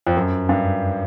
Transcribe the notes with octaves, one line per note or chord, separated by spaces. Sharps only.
F2
F#2
G2